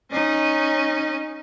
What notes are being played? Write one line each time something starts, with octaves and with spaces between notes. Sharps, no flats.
C#4 D#4